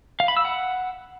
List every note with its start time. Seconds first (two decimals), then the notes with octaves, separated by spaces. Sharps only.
0.20 F5
0.28 B5
0.37 E6
0.45 F#5